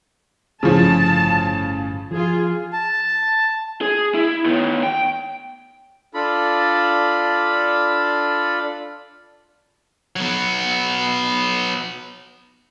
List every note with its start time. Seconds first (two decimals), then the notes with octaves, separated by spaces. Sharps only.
0.63 G1 A2 C#3 F3 A5
2.11 F3 F4 G#4
2.73 A5
3.81 G#4
4.14 E4
4.45 D#3 B3
4.83 G5
6.14 D4 F4 A4 D5 B5
10.16 F#3 B3